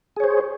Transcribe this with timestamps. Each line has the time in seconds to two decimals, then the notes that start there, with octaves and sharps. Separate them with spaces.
0.16 G#4
0.20 C#5
0.24 C5